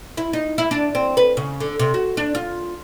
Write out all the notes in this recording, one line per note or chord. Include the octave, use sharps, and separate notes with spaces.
E4
D#4
E4
D4
C4
B4
C#3
D3
C3
F#4
D4
F4